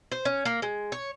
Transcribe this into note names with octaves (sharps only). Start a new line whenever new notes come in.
C5
C#4
A#3
G#3
C#5